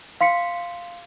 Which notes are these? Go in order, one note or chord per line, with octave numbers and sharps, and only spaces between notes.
F5 C6 B6 C#7